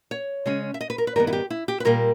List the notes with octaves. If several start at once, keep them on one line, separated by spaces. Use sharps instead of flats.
C#5
C#3 G#3 C#4
E5
D#5
B4
A#4
B4
G2 D#3 G3 B3 A#4
E4
G4
E4
G4
B4
A#2 G3 A#3 A#4